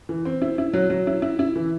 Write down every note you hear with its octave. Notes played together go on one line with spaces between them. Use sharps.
E3
C4
E4
E4
F#3
F#3
E4
E4
E4
E3